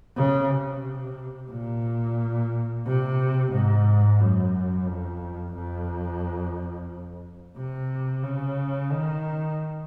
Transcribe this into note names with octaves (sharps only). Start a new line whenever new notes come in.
C#3
C3
A#2
C3
G#2
F#2
F2
F2
C3
C#3
D#3